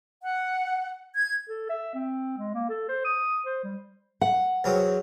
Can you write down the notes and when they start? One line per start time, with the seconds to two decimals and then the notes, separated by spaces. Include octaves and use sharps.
0.22 F#5
1.16 G#6
1.48 A4
1.70 E5
1.95 C4
2.38 G#3
2.54 A#3
2.69 A4
2.89 C5
3.05 D#6
3.46 C5
3.64 G3
4.21 F#5
4.64 E2 F#3 C4